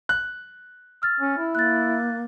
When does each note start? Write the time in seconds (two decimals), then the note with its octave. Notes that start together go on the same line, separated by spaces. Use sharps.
0.09 F#6
1.02 E6 F6 A6
1.20 C#4
1.38 E4
1.55 A#3 F#6 A6